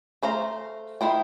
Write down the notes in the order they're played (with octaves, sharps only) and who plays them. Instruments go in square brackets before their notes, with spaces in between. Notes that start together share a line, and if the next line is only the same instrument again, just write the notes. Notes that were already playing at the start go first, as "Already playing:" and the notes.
[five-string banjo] A3 C5 F5 A#5
D#3 E4 C5 G5